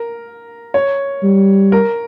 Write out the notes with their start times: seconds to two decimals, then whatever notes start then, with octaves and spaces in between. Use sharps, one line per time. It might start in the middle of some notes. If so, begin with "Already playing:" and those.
Already playing: A#4
0.74 C#5
1.23 G3
1.72 A#4